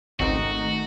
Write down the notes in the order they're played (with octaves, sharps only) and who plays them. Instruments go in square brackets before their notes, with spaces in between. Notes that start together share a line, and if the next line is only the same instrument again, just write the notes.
[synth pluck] G#1 C#2 C4 [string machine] D#3 A3 [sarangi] D#4 [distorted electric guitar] F#4